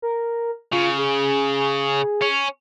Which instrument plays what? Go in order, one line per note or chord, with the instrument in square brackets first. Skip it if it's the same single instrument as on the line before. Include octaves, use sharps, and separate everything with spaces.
[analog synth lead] A#4
[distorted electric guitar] C#3 [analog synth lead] F4
[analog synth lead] G#4
[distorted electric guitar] C#4